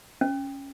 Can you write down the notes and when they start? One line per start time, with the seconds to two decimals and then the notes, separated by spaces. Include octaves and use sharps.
0.21 C#4